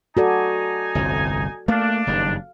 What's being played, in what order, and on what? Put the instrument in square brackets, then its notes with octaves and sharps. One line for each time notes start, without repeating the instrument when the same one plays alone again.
[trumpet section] D#4 G#5 [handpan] F#4 A4 D5
[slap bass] G1 C2 F2
[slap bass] A3 A#3 [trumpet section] D4 [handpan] F5
[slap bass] F#1 G2 D#3